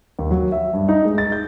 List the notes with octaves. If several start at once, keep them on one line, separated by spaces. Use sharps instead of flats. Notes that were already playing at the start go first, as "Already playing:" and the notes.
D#2
F#3
E5
G2
D#4
G#3
A6
G6